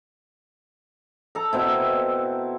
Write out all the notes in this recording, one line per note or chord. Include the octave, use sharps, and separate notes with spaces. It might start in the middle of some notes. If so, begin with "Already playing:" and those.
A4 A#5
B2 C4 E4